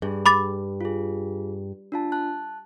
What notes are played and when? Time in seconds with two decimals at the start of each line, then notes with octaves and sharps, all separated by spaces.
0.02 G2 G#4
0.26 B5 D6 A6
0.81 F4 G#4
1.92 D4 F4 A5
2.12 A5 F#6